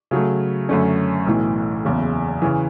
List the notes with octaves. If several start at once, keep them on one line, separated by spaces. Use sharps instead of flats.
C#3 F#3 A3
F#2 D3 A3 C#4
B1 A2 E3
F#1 E2 C#3
C#3 E3